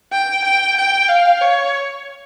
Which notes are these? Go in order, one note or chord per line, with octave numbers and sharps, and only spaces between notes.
G5
G5
G5
F5
C#5